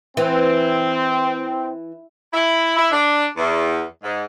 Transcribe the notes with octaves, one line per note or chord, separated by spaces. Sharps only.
E3 C4
E4
E4
D4
E2
G#2